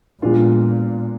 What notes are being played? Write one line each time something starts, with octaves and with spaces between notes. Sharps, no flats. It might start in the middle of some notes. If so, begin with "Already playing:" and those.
A#2 F3 G#3 B3 D4 F4